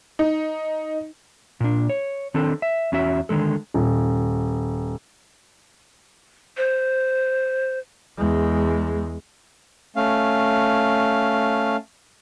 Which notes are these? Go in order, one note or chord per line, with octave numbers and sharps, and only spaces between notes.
D#4
A#2 D4
C#5
D#3 C4 D4 A4
E5
E2 C#4 F#4 E5
D3 D#3 G#3 A4
D#1
C5
E2 G#3
A3 C#4 F5